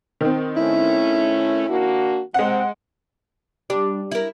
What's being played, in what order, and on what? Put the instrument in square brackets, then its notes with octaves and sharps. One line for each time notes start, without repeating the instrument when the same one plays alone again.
[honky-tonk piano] D#3 C4
[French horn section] A3 C#4 [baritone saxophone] E4
[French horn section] A#3 D4 F#4
[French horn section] C3 C4 [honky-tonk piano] G#3 F#5
[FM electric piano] G3 [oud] D4
[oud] E4 A#4